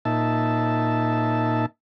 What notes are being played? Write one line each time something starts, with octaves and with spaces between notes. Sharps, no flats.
A#2 D#4 E5 A5